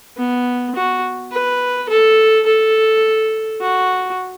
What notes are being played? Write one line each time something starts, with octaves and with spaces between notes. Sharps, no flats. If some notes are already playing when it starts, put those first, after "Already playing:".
B3
F#4
B4
A4
A4
F#4